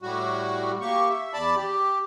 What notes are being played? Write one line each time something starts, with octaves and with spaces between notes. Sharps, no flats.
A2 G3 F#4
A#3 G4 C#6
E5
E2 D5 A5 B5
G4